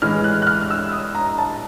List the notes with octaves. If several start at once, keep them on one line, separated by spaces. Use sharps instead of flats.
A2 E3 G#3 F6
F#6
F#6
F6
F6
E6
D#6
A#5
A5